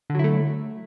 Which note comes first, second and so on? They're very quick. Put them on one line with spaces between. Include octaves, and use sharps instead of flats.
D3 F#3 E4 A3